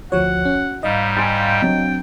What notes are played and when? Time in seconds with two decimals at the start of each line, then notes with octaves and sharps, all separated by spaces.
0.12 D2 F3 F#4 C#5 F#5
0.45 C#4
0.83 G#2 G3 D#5 F5
1.17 G5 G#5 C6 A6
1.62 F#3 C4 D4